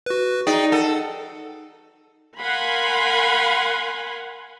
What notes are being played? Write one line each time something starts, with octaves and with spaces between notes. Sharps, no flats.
F#4 B4
D#4 G#4 D5 G5
A4 F#5
A#4 F5 F#5 G#5 B5 C6